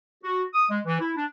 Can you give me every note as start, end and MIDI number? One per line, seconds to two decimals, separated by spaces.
0.24 0.42 66
0.54 0.66 87
0.70 0.79 56
0.85 1.00 52
1.00 1.12 64
1.17 1.25 62